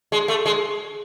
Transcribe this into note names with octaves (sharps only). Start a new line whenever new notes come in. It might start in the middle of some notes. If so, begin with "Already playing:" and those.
G#3
A3
G#3